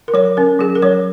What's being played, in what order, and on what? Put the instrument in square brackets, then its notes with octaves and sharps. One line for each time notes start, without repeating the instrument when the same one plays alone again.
[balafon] A#4
F#3 C#5
C#4 A#4
F#3 G#4
A#4
F#3 C#5